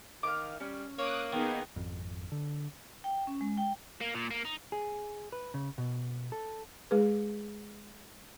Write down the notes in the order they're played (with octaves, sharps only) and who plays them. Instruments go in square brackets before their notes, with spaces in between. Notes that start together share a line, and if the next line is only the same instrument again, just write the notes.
[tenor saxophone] D#3 [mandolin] F5 D6
[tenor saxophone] G3 [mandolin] C#4
[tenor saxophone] A#3 [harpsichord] C#5 [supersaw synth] D6 D#6 F#6
[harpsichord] D#3 [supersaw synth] B3 D#4 G#4
[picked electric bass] G#1 F2
D3
[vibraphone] G5
C#4
G#3
G5
[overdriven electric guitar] A#3
A#2
A#3
D#4
[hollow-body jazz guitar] G#4
B4
C#3
B2
A4
[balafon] G#3 G#4 B4